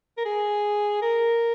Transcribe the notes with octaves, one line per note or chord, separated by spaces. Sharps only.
A#4
G#4
A#4